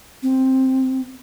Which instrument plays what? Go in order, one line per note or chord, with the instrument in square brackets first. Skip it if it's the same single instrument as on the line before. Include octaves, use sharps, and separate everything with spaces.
[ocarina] C4